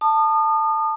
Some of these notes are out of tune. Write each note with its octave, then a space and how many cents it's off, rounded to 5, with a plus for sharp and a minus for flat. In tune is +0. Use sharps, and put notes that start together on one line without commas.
A5 +10 D#6 -35